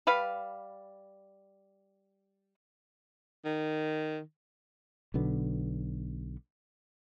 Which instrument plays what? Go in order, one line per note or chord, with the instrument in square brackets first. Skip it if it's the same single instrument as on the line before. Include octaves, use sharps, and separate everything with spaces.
[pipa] G3 B4 F5
[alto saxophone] D#3
[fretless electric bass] B1 B2 D3 B3